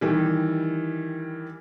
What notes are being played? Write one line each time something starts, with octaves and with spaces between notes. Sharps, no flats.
D#3 E3 G3